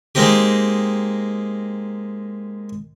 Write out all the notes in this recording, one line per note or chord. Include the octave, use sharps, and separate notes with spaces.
G#3 A#3 C4 D#4 G4